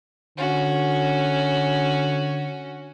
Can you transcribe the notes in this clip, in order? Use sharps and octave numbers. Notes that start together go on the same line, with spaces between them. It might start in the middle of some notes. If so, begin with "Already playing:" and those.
D3 C#4 F#4